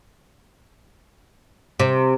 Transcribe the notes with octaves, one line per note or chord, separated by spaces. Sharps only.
C3